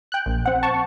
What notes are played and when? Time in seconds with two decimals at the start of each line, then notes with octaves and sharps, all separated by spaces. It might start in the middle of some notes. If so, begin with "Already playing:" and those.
0.12 G5 F#6
0.26 A#1
0.46 C4 F#5
0.63 A5 C#6